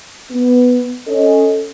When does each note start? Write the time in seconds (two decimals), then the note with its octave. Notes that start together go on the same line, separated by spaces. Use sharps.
0.30 B3
1.07 C#4 A4 D#5